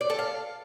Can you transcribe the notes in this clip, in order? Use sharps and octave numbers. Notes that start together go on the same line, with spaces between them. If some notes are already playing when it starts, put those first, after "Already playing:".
D5
A4
F5